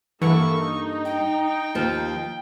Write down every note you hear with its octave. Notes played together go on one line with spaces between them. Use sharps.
G2 E3 A#3 E4 A4 F#5 C#6
D#4
G5
D#2 F3